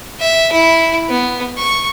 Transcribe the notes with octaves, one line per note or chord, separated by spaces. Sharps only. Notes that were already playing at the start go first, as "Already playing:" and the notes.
E5
E4
B3
C#6